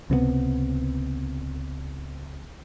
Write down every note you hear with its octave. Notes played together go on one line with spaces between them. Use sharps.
C#2 C3 F3 B3